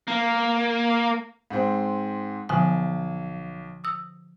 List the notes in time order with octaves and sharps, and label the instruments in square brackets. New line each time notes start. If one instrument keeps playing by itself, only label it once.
[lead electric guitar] A#3
[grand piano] G#2 C4
[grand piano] B1 [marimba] D3 F3 G#5
[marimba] D#6 E6